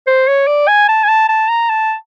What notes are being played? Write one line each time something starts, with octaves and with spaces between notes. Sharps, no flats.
C5
C#5
D5
G#5
A5
G#5
A5
A5
A#5
A5